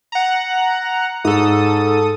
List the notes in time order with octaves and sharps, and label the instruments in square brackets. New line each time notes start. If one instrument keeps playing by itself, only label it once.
[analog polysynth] F#5 A#5
[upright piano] G#2 [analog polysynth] A4 D#6